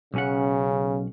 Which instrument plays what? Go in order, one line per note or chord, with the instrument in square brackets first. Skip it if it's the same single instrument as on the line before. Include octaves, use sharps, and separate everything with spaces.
[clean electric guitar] B1 C#4 F#5 [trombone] C#3